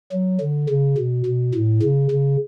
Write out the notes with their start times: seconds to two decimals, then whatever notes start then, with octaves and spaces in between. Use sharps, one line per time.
0.13 F#3
0.41 D3
0.69 C#3
0.98 B2
1.26 B2
1.54 A2
1.82 C#3
2.11 C#3